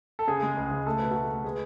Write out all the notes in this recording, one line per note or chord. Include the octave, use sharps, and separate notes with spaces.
A4
C#3 G#4
G#3
C#2
C#2
A3 A4
B2 B4
A3 F#4 A4
A3
G#3 G#4 B4